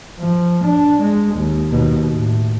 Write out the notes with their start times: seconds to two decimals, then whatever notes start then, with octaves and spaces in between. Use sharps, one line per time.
0.19 F3
0.65 D4
1.03 G#3
1.36 D#2
1.70 D#2 B2
2.10 A2